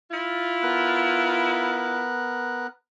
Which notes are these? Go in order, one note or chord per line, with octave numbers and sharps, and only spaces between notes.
E4 F4
B3 A#4 F#6